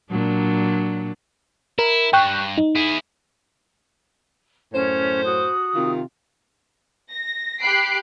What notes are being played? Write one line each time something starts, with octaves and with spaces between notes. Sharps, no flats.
A#2 F#3 D4
E4 A#4
G2 G5 C#6 F#6
D#4
E4 G#4
F#2 A2 C#4 C5
F#4 D#6
C3 D#3 F4
A#6
G4 B5 F#6 C7 D7